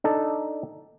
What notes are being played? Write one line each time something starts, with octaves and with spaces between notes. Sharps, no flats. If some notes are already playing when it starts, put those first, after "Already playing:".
D4 D#4 A4